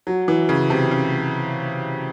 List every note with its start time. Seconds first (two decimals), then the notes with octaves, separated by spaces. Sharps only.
0.07 F#3
0.28 E3
0.49 C#3
0.70 C3
0.91 C#3